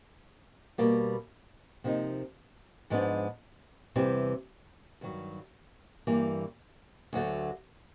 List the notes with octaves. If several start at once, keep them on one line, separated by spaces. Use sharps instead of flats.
B2 G3 A#3
C3 F3 A#3 D#4
G#2 F3 G#3 B3 D4
E2 C3 E3 G3
G2 D#3 F#3
G2 E3 G3 A#3
D2 D3 F#3 A3